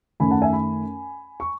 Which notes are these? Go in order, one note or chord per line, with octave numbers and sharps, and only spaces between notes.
F#2 D#3 A3 C#4 G#5 B5
F#5 A5
E5 G#5
G#5 B5
C#6